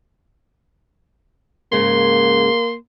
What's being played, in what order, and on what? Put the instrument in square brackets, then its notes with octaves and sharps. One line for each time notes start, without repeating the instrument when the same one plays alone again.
[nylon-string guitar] G#2 C#3 G#3 [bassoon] A#3 [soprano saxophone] C6